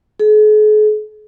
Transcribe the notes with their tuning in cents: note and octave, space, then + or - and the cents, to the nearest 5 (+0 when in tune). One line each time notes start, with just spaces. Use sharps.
G#4 +45